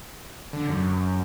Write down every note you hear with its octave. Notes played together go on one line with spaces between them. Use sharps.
D3
F#2